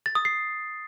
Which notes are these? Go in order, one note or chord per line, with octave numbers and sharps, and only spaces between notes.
A6
D#6
C7